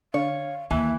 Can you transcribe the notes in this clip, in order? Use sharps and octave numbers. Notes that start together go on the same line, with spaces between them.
D3 C#5 F5
D#2 E3 E5